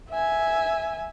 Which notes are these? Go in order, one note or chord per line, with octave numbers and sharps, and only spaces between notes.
E5 G#5